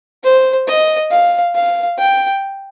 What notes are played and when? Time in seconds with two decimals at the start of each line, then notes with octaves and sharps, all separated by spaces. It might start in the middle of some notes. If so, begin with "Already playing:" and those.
0.23 C5
0.68 D#5
1.11 F5
1.55 F5
1.98 G5